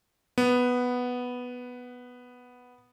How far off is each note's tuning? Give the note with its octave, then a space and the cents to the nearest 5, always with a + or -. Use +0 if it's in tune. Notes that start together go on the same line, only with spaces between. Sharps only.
B3 +0